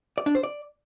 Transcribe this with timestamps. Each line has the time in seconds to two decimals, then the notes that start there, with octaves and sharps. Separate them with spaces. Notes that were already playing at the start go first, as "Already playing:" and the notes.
0.18 D5
0.26 D4
0.35 C5
0.43 D5